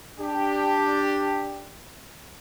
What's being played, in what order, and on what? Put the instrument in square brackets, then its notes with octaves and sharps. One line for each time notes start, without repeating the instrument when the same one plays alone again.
[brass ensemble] D4 G4